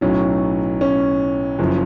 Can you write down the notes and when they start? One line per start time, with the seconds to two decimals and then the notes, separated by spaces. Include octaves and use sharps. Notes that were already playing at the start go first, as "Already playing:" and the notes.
0.01 B1 A2 F#3 C#4
0.81 C#4
1.59 F#1 F#2 F3